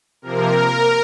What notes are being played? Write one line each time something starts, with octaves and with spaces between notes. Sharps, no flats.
C3 F3 A#3 A#4